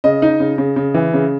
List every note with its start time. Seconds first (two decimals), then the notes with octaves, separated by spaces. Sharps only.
0.04 C#3 D#5
0.22 D#4
0.40 C#3
0.58 C#3
0.76 C#3
0.94 E3
1.14 C#3